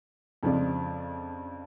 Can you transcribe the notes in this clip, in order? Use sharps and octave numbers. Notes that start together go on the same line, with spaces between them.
F2 C#3 F3 G#3 D4